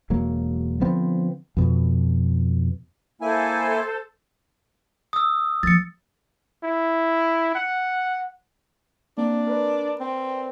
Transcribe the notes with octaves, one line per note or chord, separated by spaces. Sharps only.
E1 F#3 A#3
D3 F3 B3 C4
F2 B2
A#3 E4 A4 C5 G#5
D#6 E6
F3 A#3 A6 C#7
E4
F#5
A#3 C4 D4
A#4 B4 D5
C4